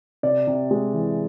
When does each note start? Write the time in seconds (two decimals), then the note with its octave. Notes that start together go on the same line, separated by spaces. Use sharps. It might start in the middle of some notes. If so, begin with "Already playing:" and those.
0.23 C3 D5
0.47 C3
0.71 G#3
0.93 E3